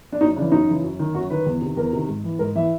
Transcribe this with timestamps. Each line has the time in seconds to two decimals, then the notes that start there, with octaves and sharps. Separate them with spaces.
0.12 D4
0.21 F#2 D#4
0.36 C#3 D4
0.40 E3
0.52 F#2 D#4
0.68 C#3 E3
0.84 F#2
0.99 D#3
1.15 F#2 F#4
1.30 D#3 B4
1.46 E2
1.61 C3 D#3
1.77 E2 A#4
1.93 C3 D#3
2.08 G#2
2.24 E3
2.39 G#2 A#4
2.55 E3 E5